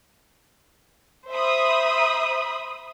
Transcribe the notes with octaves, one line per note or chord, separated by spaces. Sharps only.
C5 E5 B5 D#6